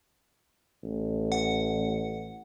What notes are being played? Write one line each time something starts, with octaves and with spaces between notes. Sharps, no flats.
A1
F#5